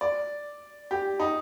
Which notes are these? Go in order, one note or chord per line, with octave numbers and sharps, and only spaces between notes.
D5
G4
D#4